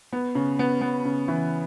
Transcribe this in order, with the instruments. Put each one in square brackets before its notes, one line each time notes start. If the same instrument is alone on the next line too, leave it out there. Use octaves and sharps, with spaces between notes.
[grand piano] B3
C#3
B3
B3
C#3
E3